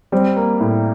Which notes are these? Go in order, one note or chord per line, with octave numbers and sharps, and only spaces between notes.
G3 C4
A#3
A2